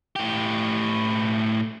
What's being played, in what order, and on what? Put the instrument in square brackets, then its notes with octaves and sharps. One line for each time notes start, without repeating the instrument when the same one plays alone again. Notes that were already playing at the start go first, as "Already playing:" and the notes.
[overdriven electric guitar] A2 G4